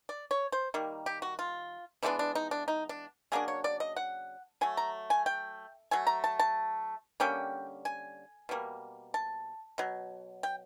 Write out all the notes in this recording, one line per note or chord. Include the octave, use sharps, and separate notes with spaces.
D5
C#5
C5
D#3 G3 A#3
G4
F#4
F4
E3 G#3 B3 D4 D#4
D4
D#4
D4
D#4
D4
C#3 F#3 A#3 D4 G#4
C#5
D5
D#5
F#5
F#3 A3 G#5
A#5
G#5
G5
F#3 A3 G#5
A#5
A5
A5
D3 G3 A#3 C#4 G5
G#5
B2 G3 A#3
A5
B2 F#3
G5